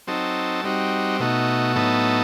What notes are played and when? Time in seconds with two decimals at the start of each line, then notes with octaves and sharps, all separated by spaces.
0.07 F#3 C4 D#4 A4
0.64 G3 C4 D#4 F#4
1.20 B2 A3 D#4 F#4
1.76 A2 F#3 B3 D#4 A4